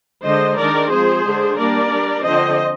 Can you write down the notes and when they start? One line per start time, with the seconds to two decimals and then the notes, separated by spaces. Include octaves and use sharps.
0.23 D3 G#3 D4 C5 D#5
0.57 D#3 G#3 D4 A#4 D5
0.90 F3 G#3 C4 G#4 C5
1.24 D3 G#3 D4
1.57 G3 A#3 D4 A#4 D5
1.91 G3 D4
2.23 D3 F3 C4 C5 D#5